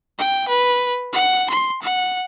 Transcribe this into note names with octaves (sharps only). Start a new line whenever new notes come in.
G5
B4
F#5
C6
F#5